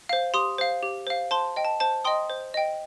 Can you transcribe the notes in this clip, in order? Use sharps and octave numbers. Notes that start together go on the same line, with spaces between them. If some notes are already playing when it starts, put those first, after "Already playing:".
C5 F5
G4 C6 D#6
C5 F5
G4
C5 F5
C5 A5 C6
D#5 G5
A5
C5 A5
D#5 G5 C6 D#6
C5
D#5 G5